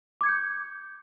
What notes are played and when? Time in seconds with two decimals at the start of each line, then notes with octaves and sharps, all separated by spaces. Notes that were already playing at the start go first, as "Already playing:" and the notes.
0.21 D6
0.23 G#6
0.26 C#7
0.29 G6